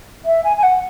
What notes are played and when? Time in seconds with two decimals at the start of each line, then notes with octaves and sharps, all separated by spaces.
0.25 E5
0.44 G#5
0.57 G#5
0.62 F#5